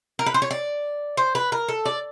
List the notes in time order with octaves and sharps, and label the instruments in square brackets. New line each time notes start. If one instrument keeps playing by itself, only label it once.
[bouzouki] A#4
B4
C5
C#5
D5
C5
B4
A#4
A4
D5